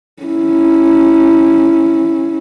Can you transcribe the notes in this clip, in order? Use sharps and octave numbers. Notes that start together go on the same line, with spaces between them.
C#4 E4